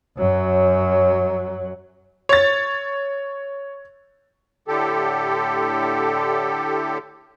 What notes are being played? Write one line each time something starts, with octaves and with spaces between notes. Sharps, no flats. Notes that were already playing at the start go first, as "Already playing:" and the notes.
F#2 F#3
C#5 A6
A2 D3 G4 A4